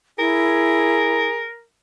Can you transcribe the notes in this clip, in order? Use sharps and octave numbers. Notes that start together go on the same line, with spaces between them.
E4 G#4 A#4